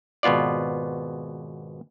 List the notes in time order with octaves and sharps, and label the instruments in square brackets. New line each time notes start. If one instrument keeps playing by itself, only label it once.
[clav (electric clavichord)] G#1 B2 B3 F4 D5